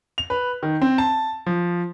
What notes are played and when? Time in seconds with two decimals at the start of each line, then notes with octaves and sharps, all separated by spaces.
0.18 F7
0.30 B4
0.63 D#3
0.81 C4
0.98 A5
1.46 F3